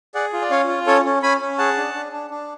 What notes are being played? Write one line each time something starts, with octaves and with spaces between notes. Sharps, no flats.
G#4 D5 F#5
F4
D5
C#4 C#5 F5
F4
C#4 A4 C#5
C#4
C#4 G#5 B5
C#4
G#4 F#5 A5
D4
D4
D4
D4